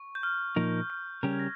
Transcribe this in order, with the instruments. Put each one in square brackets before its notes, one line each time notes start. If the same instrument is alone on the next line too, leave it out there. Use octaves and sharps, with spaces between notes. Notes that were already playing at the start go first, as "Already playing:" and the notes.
Already playing: [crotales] C#6
G6
F6
[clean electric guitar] A#2 F3 A#3 D#4 A#4
[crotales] F6
[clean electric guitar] C#3 G3 C#4 G4 A#4 [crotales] G6
[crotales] G#6
A#6